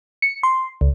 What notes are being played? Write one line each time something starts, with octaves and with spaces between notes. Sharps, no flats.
C#7
C6
C#2